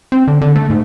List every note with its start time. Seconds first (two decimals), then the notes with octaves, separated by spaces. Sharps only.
0.12 C4
0.28 D3
0.41 D3
0.56 A3
0.70 G#2